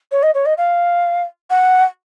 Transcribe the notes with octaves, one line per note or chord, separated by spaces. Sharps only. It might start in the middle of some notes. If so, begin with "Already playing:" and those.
C#5
D#5
C#5
D#5
F5
F#5